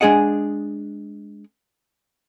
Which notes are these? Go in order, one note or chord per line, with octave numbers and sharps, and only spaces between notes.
G#3 D4 G#4 D#5 F#5